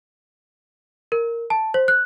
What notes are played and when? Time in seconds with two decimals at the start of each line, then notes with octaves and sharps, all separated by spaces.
1.12 A#4
1.50 A5
1.74 C5
1.88 F#6